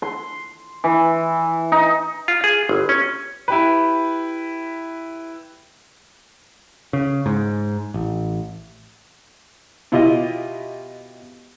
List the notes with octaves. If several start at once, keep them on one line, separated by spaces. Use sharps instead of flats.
C6
E3
D#4
F4
G#4
G1
C#4
E4 G4 B4
C#3
G#2
A1
B2 E4 F4 G4 D#5